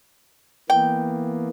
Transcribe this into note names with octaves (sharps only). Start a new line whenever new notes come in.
E3 A#3 B3 G5